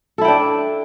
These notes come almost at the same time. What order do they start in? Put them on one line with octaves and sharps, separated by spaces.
A4 E4 G5 D4